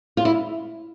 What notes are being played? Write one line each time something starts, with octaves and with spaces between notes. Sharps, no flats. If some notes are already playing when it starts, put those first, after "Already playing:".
F4
E4